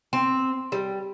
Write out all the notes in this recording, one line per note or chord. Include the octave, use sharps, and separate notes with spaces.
C4
G3